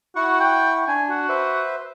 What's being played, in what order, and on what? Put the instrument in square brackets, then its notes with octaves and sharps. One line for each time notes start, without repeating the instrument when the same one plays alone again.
[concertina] E4 F#5 C#6 [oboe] F#4
[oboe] G5
[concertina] D4 [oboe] G#5
[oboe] F#4
[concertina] B4 C5 E5